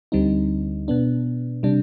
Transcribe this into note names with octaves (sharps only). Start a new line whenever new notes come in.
D2 D3 G3 C4 D#4
B2 B3 D4
C3 G3 D4